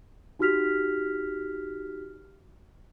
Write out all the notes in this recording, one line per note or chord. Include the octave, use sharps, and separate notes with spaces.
D#4 F#4 G4 F6 B6 F7